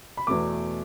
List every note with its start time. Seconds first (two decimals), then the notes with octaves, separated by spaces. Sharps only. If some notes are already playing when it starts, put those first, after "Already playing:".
0.17 B5
0.27 E2 B2 A3 D6